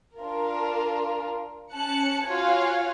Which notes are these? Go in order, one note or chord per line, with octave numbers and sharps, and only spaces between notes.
D4 F4 A#4
C#4 A5 F#6 C#7
F4 F#4 C#5 F5 G#5